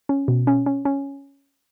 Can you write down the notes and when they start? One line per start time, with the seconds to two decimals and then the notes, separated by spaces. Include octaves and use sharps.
0.09 C#4
0.28 B2
0.47 C#4
0.66 C#4
0.85 C#4